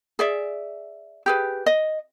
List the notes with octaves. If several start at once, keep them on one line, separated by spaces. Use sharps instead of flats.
G#4 D5 E5
G4 G#4 B4
D#5